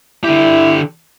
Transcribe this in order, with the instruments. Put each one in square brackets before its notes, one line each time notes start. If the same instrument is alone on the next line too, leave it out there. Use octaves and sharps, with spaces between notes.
[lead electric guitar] D3 G4 [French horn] E4